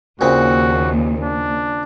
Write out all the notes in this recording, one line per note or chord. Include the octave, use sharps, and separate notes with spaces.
D#2 A#2 C#3 C4 F#4
D4